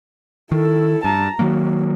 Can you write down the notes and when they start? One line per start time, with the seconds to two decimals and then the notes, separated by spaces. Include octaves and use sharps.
0.52 D#3 E4 A4
1.04 G2 A5 A#5
1.39 D#3 F#3 A#3 F#4